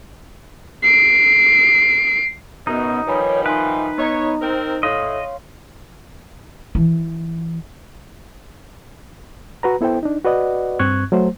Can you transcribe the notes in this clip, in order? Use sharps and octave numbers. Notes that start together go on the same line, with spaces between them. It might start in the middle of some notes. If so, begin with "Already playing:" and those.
C7 D7
F#2 B2 B3 D#4
D#3 F3 G3 B4 C#5 G#5 B5
D#4 B4 E5 G#5 C6
B3 C#5 D#5 A#5
C4 A#4 C5
A2 C#5 D#5 F5 C6
E3
F#4 B4 A#5
B3 E4 A4 C5 G5
D4 D#4
F#4 B4 D5 D#5 F#5
G2 C4 C#6 F#6 G#6
F#3 A3 C5